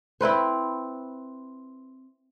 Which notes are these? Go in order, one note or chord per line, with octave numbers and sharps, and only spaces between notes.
C4 E4 B4 C5